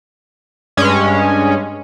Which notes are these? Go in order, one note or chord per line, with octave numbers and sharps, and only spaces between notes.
G2 G#3 C#4